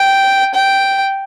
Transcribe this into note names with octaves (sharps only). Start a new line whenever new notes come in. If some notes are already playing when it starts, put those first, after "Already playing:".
Already playing: G5
G5